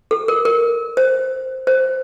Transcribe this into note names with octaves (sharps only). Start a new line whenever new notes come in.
A4
A#4
A#4
C5
C5